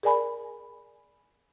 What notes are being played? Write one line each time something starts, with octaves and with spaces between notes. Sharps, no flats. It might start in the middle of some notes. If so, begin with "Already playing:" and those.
G#4 A#4 D5 G#5 B5